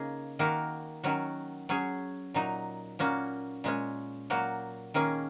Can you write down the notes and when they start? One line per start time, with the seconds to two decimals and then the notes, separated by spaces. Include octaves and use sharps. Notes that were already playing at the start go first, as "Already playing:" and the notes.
Already playing: C#3 A#3 D#4 G#4
0.39 D#3 A#3 F#4 A#4
1.04 D#3 F#3 C#4 F#4
1.69 F#3 C#4 G#4
2.34 A#2 F#3 D#4
2.99 A#2 A#3 C#4 F#4
3.64 A#2 G#3 C#4
4.30 A#2 F#3 A#3 F#4
4.94 D#3 A#3 C#4 G#4